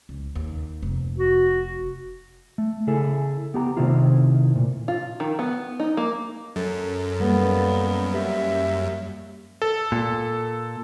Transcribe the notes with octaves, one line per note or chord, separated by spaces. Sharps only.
C#2
D#2
F1
F#4
A3
C#3 E4 G#4 A4
B3 G4 A5 A#5
C3 D#3 A3 C4 E4 F4
A#2
F4
D#3
B3
D#4
A#3
F#2 A4
G3 A#3 B3
G4 E5
A4
A#2